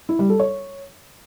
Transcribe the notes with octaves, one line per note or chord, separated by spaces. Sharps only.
E4
G3
A4
C#5